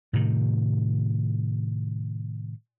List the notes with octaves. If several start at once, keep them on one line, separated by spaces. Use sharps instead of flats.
A2 C3 D#3